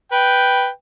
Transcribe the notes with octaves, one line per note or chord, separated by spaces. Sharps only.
B4 G5